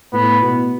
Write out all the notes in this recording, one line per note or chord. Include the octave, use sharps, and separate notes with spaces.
A2 B3
B2